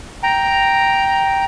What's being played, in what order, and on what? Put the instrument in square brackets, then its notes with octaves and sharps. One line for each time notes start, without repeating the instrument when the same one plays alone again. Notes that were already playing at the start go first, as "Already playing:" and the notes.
[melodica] G5 A#5